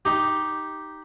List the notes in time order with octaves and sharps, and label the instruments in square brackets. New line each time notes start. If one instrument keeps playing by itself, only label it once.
[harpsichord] D#4 G4